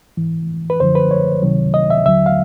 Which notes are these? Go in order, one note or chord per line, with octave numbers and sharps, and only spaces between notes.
G#2 E3
B4
F#2 D3 F3 C5
B4
C#5
C#2 C3 D#3 F#3
D#5
E5
D#2 D3 F#3 E5
F5